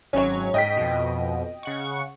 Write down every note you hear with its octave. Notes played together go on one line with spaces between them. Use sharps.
G#1 F#3 C#4 C#5
G#2 D#5 G5 B6
F2 B2
C#3 F#5 C#6